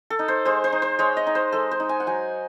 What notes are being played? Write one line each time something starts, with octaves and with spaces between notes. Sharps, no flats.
A4
D#4
C5
G#3 C5
C5
D#4
C5
G#3 C#5
D#5
D#4
C5
G#3 A4
C5
D#4
G#5
F#5
F#3 G#5